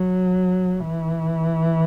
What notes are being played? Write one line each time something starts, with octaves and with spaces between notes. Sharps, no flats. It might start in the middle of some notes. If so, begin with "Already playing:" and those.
Already playing: F#3
E3